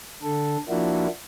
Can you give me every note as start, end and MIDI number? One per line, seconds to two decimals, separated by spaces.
0.23 0.57 50
0.23 0.57 69
0.69 1.07 53
0.69 1.07 58
0.69 1.07 62
0.69 1.07 64
0.69 1.07 66